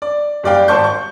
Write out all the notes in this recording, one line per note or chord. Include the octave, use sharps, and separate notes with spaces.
D5
F#1 G3 D5 F5 G5
G#1 C5 D5 A5 C#6 G6
C#6